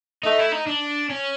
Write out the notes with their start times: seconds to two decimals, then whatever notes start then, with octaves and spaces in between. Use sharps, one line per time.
0.24 A3 D#4
0.39 E4
0.52 D#4
0.67 D4
1.10 C#4